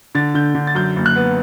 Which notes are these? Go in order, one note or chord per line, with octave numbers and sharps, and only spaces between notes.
D3 A6
D3 G6
D3
A6
F#2 G6
F#1
F#6
B3